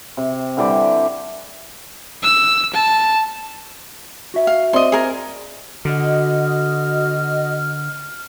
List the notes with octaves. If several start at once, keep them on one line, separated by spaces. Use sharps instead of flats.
C3
D3 E3 G3 D5
E6
A5
F#4 E5
F5
C4 D5 D#5 C6
G#4 A#4
D3 F#4 D#5 F6